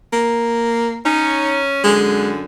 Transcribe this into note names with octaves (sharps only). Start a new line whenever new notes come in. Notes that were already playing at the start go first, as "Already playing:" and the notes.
A#3
C#4 D#4
F#2 D3 G#3